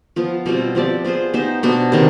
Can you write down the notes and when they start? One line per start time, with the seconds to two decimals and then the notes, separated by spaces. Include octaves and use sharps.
0.16 F3 B3 F4
0.46 B2 G3 C4 F4
0.75 F3 C4 G4 D5
1.04 B3 F4 G#4 C5
1.34 B3 D#4 G4 C5
1.63 B2 B3 D4
1.92 C3 D#3 B3 D4